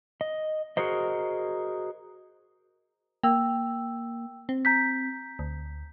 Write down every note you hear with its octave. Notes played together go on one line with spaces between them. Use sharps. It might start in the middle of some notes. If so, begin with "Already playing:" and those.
D#5
F#4 G#4 A#4 C5 D#5
A#3 G5 E6
C4
A#5 G6 B6
D2